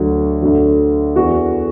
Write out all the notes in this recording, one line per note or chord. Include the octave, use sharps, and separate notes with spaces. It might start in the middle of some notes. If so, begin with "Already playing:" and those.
Already playing: D2 D3 F#3
D2 D3 F#3
E2 E3 F#4